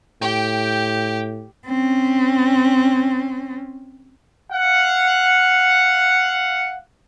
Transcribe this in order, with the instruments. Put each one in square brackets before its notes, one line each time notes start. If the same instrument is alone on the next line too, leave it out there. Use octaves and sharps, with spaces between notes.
[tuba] A2 [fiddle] G4 [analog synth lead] G5
[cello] C4 C#4
[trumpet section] F5 F#5